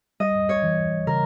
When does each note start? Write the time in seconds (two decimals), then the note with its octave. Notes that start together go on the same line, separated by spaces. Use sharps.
0.20 G3 D#5
0.49 C#5
0.64 E3
1.07 C#3 A#4